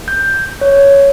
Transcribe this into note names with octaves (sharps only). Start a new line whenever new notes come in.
G6
C#5